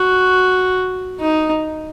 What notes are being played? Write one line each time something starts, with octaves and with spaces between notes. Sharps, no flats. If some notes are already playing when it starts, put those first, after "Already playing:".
Already playing: F#4
D#4